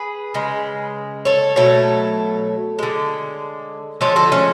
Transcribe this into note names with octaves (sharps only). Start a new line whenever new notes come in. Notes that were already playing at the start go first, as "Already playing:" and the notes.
Already playing: G#4 B4
C#3 G#3
A4 C#5
B2 F#3 A3 A4 C#5
D3 G#3
D3 F3 G#3 A4 C#5
F#4 A4
A3 C#4